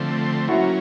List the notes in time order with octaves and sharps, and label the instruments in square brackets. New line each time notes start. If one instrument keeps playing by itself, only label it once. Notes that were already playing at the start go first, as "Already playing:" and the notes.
Already playing: [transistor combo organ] D3 F3 A3 C4
[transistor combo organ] F#3 A#3 C#4 [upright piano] E4 F#4